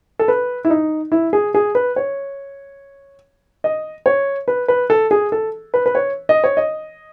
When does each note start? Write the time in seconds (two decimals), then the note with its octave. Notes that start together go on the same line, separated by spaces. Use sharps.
0.19 A4
0.28 B4
0.65 E4
0.70 D#4
1.12 E4
1.33 G#4
1.54 G#4
1.75 B4
1.96 C#5
3.64 D#5
4.06 C#5
4.48 B4
4.68 B4
4.90 A4
5.11 G#4
5.32 A4
5.74 B4
5.86 B4
5.95 C#5
6.29 D#5
6.44 C#5
6.57 D#5